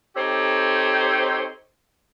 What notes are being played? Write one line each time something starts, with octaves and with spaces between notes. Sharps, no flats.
C4 D#4 G4 A4 C5 C#5